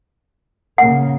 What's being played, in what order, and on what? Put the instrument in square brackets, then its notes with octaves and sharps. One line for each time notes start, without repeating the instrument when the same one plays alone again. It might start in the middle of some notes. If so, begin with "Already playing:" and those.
[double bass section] C#3 A#3 [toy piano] F#5